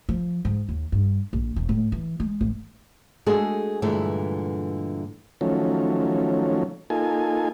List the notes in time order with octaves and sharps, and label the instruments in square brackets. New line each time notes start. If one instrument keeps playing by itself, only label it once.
[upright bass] F3
G#2
D#2
G2
A#1
E1
A2
E3
G#3
A1
[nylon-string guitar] G#3 A3 D4 F#4 G#4 A4
G2 A#2 D3 E3 G#3 A3
[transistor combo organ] D#3 F3 F#3 A3 C#4
A#3 D#4 F4 A4 G#5